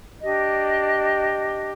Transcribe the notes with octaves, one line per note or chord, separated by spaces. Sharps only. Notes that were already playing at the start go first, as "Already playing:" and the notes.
D4 G4 D#5